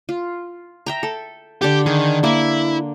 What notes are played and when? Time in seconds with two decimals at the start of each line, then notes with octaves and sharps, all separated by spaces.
0.09 F4
0.86 E5 G5 A#5
1.03 A4
1.62 D3 G4 A4 D6
1.86 D#3 G#4
2.24 A#3 E4 D6